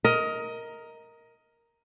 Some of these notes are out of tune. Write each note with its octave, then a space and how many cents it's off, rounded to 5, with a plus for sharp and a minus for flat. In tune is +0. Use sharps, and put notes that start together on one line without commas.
A#4 +0 D#5 +20